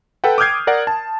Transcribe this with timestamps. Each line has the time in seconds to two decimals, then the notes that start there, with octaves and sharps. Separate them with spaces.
0.24 A4 B4 F#5 G5
0.38 D6 D#6 F6 G6 G#6 C7
0.67 A#4 D5 F#5
0.87 A5